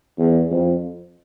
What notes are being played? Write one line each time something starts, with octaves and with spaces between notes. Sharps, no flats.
E2
F2